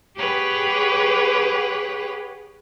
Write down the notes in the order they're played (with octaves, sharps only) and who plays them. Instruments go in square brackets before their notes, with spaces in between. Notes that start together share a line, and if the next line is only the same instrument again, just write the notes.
[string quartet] G4 G#4 B4 C#5 F#5 G5